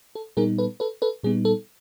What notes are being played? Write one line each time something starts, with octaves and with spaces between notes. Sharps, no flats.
A4
A#2 G3 B3 D#4 G#4 A#4
A4 B4
A4 B4
A4 B4
A#2 G3 B3 D#4 G#4
A4